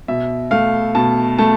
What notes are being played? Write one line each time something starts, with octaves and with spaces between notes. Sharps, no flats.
B2 E5
A3 F5
B2 A5
A3 A5